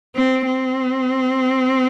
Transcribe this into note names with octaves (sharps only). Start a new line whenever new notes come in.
C4
C4